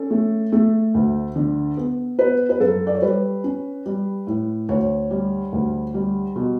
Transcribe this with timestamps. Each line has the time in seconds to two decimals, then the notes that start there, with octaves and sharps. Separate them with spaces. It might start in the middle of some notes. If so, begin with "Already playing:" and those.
Already playing: C#4 A4
0.11 A3
0.52 A3
0.94 D2
1.36 D3
1.77 B3
2.19 B3 B4
2.49 B4
2.60 F#2 A4
2.87 D5
2.95 C#5
3.02 G3 B4
3.44 C#4
3.86 G3
4.27 A2
4.69 D2 C#5
5.11 G3
5.52 D2
5.94 G3
6.36 B2